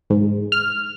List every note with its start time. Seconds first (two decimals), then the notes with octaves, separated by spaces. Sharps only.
0.10 G#2
0.52 F6